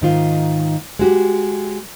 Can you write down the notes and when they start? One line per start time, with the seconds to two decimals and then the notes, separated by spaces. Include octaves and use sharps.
0.01 G#2 D#3 F4
0.99 G#3 F#4 G4